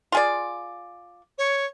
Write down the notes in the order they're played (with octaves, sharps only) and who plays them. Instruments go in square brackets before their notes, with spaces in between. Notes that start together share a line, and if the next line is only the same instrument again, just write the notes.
[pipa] F4 G#4 D5
[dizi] C#5